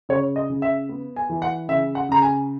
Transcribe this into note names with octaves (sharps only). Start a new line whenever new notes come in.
C#3 C#5
D#5
C#3
E5
B3
G#5
E3
F#5
C#3 E5
F#5
C#3 A#5
G#5